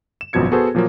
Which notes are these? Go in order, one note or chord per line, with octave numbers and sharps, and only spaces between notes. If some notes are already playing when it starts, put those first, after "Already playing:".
E7
G#1 F#2 B2 F3 G#6 C#7
B3 F#4 G#4 A4 B4 C5
A#2 F3 F#3 A#3